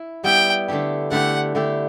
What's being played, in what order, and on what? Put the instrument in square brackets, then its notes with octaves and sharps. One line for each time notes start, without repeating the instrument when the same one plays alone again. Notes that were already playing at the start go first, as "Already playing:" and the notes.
Already playing: [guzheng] E4
[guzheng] G3 B3 E4 G4 [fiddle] G5
[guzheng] D3 A3 E4 G4
[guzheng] D3 A3 E4 G4 [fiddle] F#5
[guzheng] D3 A3 E4 G4